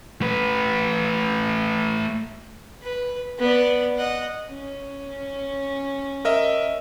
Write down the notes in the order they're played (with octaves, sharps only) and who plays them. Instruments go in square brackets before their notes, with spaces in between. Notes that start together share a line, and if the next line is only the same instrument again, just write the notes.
[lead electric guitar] A3 B4
[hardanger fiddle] B4
B3 D5
D#5 F#5
[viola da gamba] C#4
[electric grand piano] A#4 D#5 E5